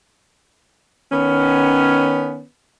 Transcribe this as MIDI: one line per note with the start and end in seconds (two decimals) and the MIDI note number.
1.12 2.45 51
1.12 2.45 59
1.12 2.45 61